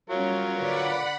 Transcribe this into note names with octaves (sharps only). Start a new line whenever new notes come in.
F#3 G3 C#4 F4 A#4 C#5
D3 B4 D5 F#5 B5